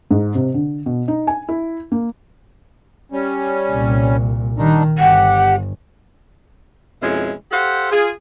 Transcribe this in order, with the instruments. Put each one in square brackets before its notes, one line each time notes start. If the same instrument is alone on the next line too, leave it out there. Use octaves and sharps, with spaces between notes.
[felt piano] G#2
C3
D3
B2
D#4
G#5
E4
A#3
[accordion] G3 C#4
[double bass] C2 A#2
[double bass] D#3 [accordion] G3 D4 D#4
[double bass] G1 [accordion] G4 [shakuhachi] F#5
[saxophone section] F2 B2 G#3 C#4 E4
G4 A4 C5 F5 F#5
F4 G#4